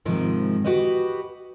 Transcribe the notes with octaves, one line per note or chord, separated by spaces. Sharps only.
G#2 C3 D#3 F3 G#3
F#4 G4 B4 D#5